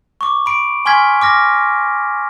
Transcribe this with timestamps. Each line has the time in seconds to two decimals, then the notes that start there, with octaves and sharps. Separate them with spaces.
0.21 C#6 D6
0.46 B5 D7
0.85 G#5 C6 C#6 F6 G#6 B6
1.22 D6 F6 A#6